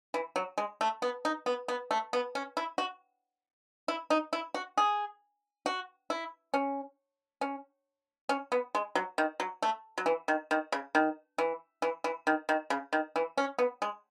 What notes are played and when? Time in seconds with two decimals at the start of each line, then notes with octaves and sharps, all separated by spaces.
0.14 E3
0.36 F#3
0.58 G#3
0.81 A3
1.02 B3
1.25 D#4
1.46 B3
1.68 B3
1.91 A3
2.13 B3
2.35 C#4
2.57 E4
2.78 F#4
3.88 E4
4.10 D#4
4.33 E4
4.54 F#4
4.77 G#4
5.66 F#4
6.10 E4
6.54 C#4
7.41 C#4
8.29 C#4
8.52 B3
8.75 G#3
8.95 F#3
9.18 D#3
9.40 F#3
9.62 A3
9.98 F#3
10.06 E3
10.28 D#3
10.51 D#3
10.72 C#3
10.95 D#3
11.38 E3
11.82 E3
12.04 E3
12.27 D#3
12.49 D#3
12.70 C#3
12.93 D#3
13.16 E3
13.37 C#4
13.59 B3
13.82 G#3